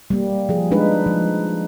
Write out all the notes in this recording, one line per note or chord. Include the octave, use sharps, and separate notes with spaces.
G3 A#3
F3 G#4
G#3 D4 D#4 B4
F3